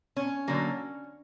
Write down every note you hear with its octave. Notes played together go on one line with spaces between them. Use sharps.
C#4
D3 F#3 A#3